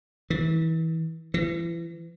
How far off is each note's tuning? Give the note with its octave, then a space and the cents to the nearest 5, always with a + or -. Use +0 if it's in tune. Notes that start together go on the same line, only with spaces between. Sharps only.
E3 -30
E3 +35